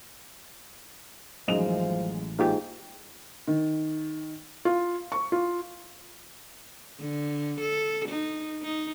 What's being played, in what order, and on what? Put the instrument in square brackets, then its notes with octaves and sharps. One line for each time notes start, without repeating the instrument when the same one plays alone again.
[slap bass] A1 [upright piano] F#2 G#3 F7 [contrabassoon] F3 [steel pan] D#4 D#5
[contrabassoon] G#2 [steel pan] A#3 F4 G4
[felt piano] D#3
F4
C#6
F4
[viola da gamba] D3
A4
D#4
D#4